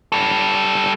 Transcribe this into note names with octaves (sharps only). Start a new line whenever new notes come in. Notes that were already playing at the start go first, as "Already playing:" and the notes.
G3 A4